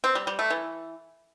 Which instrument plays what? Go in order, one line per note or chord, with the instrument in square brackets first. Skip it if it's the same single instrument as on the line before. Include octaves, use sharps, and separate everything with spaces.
[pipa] C4
G3
G3
A3
E3